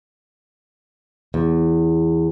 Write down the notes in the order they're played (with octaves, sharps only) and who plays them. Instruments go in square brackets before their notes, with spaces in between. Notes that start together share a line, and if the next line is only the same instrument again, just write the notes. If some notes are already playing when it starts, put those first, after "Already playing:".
[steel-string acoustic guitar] E2